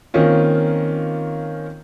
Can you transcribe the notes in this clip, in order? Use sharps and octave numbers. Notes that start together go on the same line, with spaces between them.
D#3 A#3 C4 C#4 F4